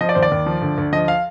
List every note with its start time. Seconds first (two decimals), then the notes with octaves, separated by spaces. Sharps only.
0.01 F3 D#5
0.09 D5
0.15 D#2 C5
0.23 D5
0.32 D#2
0.46 F3
0.62 D2
0.78 D2
0.93 F3 D#5
1.08 F5